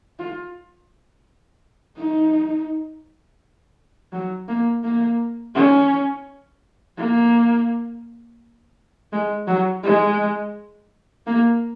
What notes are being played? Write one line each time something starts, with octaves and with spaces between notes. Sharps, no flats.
F4
D#4
F#3
A#3
A#3
C#4
A#3
G#3
F#3
G#3
A#3